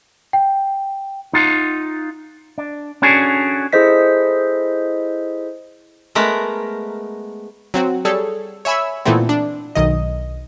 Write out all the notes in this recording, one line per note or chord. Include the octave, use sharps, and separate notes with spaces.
G5
D#4 F4 F#5
D4
C#4 D4 F#4 G#4 A4
E4 G#4 A4 C5 D#5 B6
G#3 A3 B3 A#4
F#3 C4 F#4
G3 G#4 A4 C#5
C#5 E5 G#5 B5 E6
A#2 E3 A3 B3 C4
D4
B1 D#3 D#5